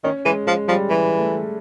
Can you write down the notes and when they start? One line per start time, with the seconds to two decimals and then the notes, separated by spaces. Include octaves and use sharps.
0.04 D#3 C#4
0.25 E3 G#3
0.47 F3 G#3
0.68 F3 G3
0.89 E3 G3
1.18 A3